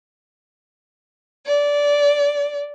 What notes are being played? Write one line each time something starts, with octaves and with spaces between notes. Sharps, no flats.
D5